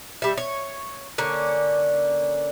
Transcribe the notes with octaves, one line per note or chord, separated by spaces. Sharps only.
G3 E5
C#5
D3 A#3 C#4 C#5